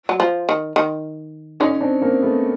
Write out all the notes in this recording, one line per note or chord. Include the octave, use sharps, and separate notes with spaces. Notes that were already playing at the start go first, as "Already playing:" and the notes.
F#3
F3
D#3
D#3
D3 C#4 D#4
C4 D4
A#3 C4
A3 B3